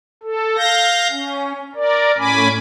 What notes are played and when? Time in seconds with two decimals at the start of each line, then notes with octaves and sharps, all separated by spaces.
0.23 A4
0.57 F5 G6 A#6
1.10 C#4
1.75 A#4 D5
2.18 A2 C#4 G#5 B5 D6